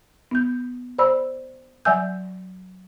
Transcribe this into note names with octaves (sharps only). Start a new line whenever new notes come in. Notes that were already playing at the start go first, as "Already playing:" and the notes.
B3 G6
C5 D5 B5 E6
F#3 D5 E5 G#5 E6 G6